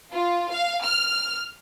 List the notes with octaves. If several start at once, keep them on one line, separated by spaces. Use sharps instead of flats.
F4
F5
F6